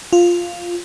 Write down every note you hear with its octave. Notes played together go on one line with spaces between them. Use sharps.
F4